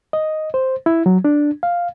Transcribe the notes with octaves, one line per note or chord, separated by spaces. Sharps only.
D#5
C5
E4
F#3
D4
F5